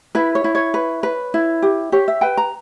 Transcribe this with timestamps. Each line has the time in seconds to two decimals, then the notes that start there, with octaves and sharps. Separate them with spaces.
0.15 E4 B4
0.35 C#5
0.44 E4
0.55 C#5
0.74 B4
1.03 B4
1.34 E4
1.62 G4
1.92 G4 C#5
2.08 E5
2.21 B4 G5
2.37 A#5